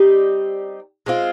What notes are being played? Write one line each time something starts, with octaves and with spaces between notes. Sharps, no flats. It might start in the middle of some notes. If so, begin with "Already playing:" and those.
Already playing: G3 C4 D#4 G4
G#3 C4 F4